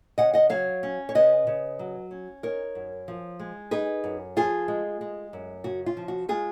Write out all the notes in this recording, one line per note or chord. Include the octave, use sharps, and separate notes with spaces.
C#3 D#5 F#5
D#5 F#5
F#3 C#5 F5
C#4
C#5
C#3 B4 D#5
C#3
F#3
C#4
D#4 A#4 C#5
F#2
F3
G#3
D#4 G#4 B4
F#2
F3 F4 G#4
G#3
G#3
F#2
C#3 F#4
F4
F3
F#4
G#3 F4 G#4